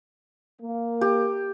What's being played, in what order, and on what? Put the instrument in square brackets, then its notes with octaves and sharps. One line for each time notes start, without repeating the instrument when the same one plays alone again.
[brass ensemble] A#3
[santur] G4